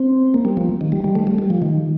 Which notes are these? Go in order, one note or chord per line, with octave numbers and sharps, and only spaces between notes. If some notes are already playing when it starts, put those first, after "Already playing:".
Already playing: C4
A#3
G3
F3
D#3
G3
G3
A3
G3
G3
F3
D#3